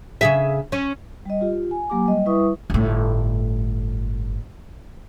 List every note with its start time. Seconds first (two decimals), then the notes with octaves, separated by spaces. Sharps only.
0.21 C#3 G#4 E5
0.72 C#4
1.25 G3 D#5
1.41 F4 G4
1.71 G#5
1.90 F#3 A#3 G4 G#5 D6
2.06 G3 D#5
2.26 G3 E4 B4 E5 C#6 D#6
2.70 G1 A2